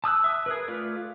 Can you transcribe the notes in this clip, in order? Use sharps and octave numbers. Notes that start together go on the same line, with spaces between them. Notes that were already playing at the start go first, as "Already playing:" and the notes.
A5 D#6 E6 F#6
E5 D#6
G#4 A#4 B4
A3 F4 B4 D5